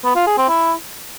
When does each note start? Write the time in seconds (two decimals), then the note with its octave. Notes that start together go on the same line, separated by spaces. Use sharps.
0.05 B3
0.16 F4
0.27 G#4
0.38 C4
0.49 E4